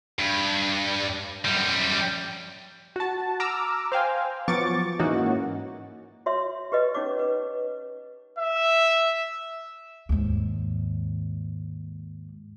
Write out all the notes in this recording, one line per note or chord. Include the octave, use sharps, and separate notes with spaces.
G2
F#2 G3
F#4 A5
A#5 D6 E6 F6
C5 F5 G5 G#5
F3 F#3 B3 C#6 D6 A6
G#2 E3 A#3 C#4 D#4 F#4
F#4 C#5 E5 C6
G4 B4 D#5
C#4 D#4 C#5 D6
B4
E5
D#2 G#2